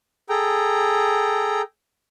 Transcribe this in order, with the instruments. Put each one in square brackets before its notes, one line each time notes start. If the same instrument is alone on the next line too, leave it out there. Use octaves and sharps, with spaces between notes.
[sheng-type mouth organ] G#4 A4 G5 A#5